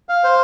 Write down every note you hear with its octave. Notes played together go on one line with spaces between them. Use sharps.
F5
C5